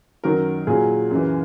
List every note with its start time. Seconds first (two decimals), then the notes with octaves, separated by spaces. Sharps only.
0.24 F#2 D#3 F#3 A#4
0.67 A#2 F#3 G#4
1.11 F#2 E3